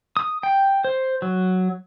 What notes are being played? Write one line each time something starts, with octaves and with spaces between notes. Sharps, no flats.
D#6
G5
C5
F#3